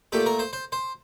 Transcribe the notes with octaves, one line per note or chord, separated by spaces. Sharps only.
A#2 A3 G4
A#4
C5
C5
C5